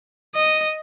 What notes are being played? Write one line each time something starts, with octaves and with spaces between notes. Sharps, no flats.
D#5